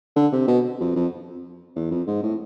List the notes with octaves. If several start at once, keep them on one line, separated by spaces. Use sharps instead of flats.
D3
C3
B2
F2
F2
E2
F2
G#2
A2